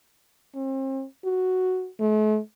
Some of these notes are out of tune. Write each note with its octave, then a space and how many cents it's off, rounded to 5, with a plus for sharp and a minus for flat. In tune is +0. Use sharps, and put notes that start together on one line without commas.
C4 +40
F#4 +0
A3 -45